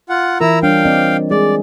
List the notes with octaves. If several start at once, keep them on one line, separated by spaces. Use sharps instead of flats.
F4 F#5
E3 E4 F4 A#4 A#5 E6
G3 D4 C#5 F5 G5
C4 D5 D#5
G#3 G#4 D5